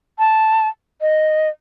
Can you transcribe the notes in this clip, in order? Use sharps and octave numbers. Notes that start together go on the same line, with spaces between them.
A5
D#5